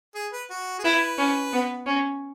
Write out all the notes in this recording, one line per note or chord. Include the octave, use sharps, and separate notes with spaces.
G#4
B4
F#4
G#4
E4 B4
C#4
B3
C#4